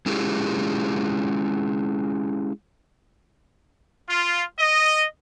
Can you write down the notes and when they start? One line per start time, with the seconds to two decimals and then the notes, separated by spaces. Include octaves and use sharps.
0.06 G#3 C#4 E4 F4 G4 G#4
4.09 F4
4.59 D#5